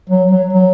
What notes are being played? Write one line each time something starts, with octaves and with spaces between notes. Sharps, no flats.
F#3
F#3
F#3